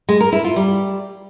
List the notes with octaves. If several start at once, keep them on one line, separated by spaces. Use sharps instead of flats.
G#3
A#4
E4
F4
G3